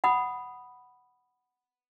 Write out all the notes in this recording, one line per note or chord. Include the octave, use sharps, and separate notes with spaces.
F#5 B5 D#6